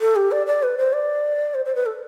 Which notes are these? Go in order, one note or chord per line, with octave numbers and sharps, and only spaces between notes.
A4
G4
D5
D5
B4
C5
D5
C5
C5
B4
A4